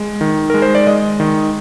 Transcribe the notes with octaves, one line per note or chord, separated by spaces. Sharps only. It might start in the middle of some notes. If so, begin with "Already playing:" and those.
Already playing: G#3
D#3
G#3 A#4
C5
D5
G#3 D#5
D#3